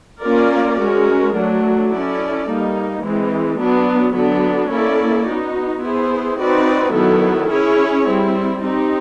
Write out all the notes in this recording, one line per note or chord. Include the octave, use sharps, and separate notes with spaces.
A#3 C#4 F4 A#4 D5
G#3 C#4 F#4 A#4
F#3 A3 D4
C#4 E4 A4 D5
G3 A#3 D#4
E3 G#3 C4
F#3 B3 D4
D3 F#3 B3 D4
A#3 C#4 E4 A4 D5
B3 D#4 F#4
B3 E4 G#4 C5
C4 D#4 F#4 B4 D5
D#3 F#3 B3 E4 A4
C#4 E4 G#4 C#5
G3 C4 E4
C4 D#4 G4